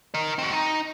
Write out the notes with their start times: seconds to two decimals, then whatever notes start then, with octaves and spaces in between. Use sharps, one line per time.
0.14 A#4 D#5
0.38 C4 F#4
0.53 D#4